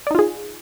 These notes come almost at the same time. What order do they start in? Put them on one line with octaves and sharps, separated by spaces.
D5 D#4 F4 G#4